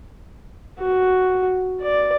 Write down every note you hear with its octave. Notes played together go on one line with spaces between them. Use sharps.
F#4
D5